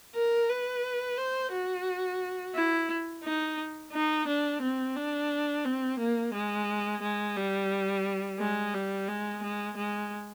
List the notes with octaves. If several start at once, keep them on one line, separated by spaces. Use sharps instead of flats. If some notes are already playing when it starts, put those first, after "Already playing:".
A#4
B4
C5
F#4
E4
D#4
D#4
D4
C4
D4
C4
A#3
G#3
G#3
G3
G#3
G3
G#3
G#3
G#3